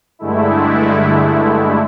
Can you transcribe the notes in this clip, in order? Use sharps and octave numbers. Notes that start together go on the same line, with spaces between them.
G2 D3 G#3 A3 E4